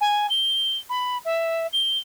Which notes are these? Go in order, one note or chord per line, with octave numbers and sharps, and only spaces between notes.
G#5
G7
B5
E5
G7